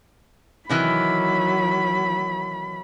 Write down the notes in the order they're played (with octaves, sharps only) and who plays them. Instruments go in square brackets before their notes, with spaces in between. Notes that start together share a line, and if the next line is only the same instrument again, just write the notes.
[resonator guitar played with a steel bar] C3 D#3 E3 [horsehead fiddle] F#3 B5